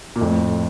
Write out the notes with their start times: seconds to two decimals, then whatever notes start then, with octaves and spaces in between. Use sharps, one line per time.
0.16 A#2
0.21 F2 A2